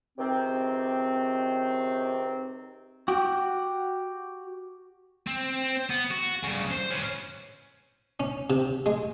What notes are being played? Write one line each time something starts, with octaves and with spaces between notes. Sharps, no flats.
C#2 C3 D#3 C4
F#4 G4
C4
B3
F#4
G2 C#3
C5
C#4 B4
C#4
C3
G#3